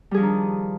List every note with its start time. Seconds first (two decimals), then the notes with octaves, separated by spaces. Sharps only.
0.11 G3
0.14 G#4
0.17 F3
0.20 D4
0.23 D#3